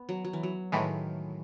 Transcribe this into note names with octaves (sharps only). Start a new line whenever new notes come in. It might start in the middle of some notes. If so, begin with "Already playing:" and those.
Already playing: B3
F#3
F#3
E3
F#3
A2 D#3 E3 G#3